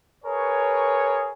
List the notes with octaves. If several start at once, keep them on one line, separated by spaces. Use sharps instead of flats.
G#4 A#4 B4 C#5